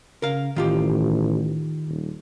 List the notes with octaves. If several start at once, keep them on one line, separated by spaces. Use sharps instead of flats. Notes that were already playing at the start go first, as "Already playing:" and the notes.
C#3 A#4 F5
A1 D#3 F4 G4
D#1